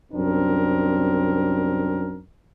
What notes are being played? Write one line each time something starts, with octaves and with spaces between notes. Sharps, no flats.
C2 F#2 C4 D4 A#4